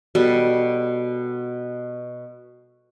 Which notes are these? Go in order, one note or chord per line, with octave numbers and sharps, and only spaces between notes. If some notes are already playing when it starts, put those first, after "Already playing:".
B2 G3 B3 A4